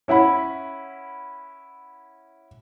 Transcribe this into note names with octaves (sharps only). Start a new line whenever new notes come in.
C#4 E4 F#5 B5